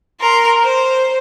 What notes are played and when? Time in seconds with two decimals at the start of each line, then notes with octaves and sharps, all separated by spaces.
0.20 A#4 C6
0.63 C5